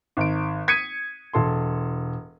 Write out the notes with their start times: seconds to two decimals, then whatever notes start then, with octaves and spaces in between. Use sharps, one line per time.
0.17 G#1 D7
0.68 D#6 G#6 B6 C#7 D#7
1.33 E1 A4 C6